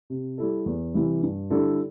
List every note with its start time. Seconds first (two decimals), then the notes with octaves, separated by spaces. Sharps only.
0.10 C3
0.38 G3 E4 A4
0.66 E2
0.94 C3 E3 G3 E4
1.22 G2
1.50 D3 G3 E4 A4